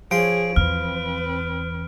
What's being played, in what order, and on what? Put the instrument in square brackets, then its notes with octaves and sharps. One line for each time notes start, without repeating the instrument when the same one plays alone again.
[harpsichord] F3 C6 [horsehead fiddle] G#4 C#5 [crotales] D7
[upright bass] E2 [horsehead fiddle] C4 B4 [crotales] F6